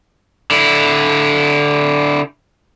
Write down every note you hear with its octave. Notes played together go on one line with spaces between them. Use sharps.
D3 E4